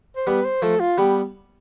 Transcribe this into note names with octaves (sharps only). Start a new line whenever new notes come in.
C5
G3 B3 B4
C5
F3 A3 A4
F4
G3 B3 G4